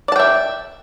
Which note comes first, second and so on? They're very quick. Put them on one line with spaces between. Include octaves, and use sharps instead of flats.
D5 A5 G5 E5